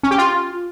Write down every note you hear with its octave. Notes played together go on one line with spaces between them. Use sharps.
C#4
G4
F4